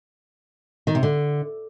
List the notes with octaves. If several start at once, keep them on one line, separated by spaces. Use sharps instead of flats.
D#3
C3
D3